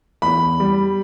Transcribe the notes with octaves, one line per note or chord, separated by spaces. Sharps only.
E2 B5
G3